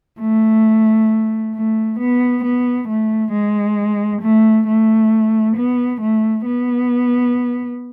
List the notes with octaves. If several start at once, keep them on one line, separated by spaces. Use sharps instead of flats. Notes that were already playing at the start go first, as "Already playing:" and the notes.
A3
A3
B3
B3
A3
G#3
A3
A3
B3
A3
B3